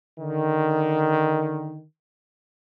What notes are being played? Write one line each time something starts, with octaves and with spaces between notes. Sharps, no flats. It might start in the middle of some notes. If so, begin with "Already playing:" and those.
D3 D#3